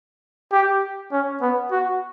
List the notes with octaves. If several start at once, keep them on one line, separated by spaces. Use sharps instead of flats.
G4
C#4
B3
F#4